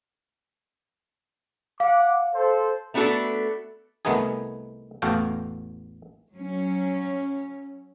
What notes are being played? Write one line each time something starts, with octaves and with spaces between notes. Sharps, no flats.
F5 F#5 D6
A4 C5
A3 B3 D4 F#4 A4
C2 D#3 A3 B3 D#4 G#4
A1 E2 F#4 A4 F5 G5
F#3 C#4